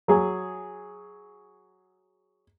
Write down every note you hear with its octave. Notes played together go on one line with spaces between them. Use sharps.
F#3 G#4